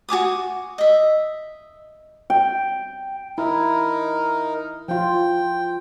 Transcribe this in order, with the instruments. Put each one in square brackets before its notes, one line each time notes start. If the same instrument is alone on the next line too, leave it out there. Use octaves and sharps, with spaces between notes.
[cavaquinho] F#4 G#5 D6 D#6
D#5 E5
[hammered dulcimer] G5
[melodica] D#4 A#4 [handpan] E4
[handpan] F3 F4 [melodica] G5